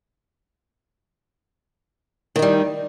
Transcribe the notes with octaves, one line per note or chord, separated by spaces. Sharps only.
D#3 G3 D#4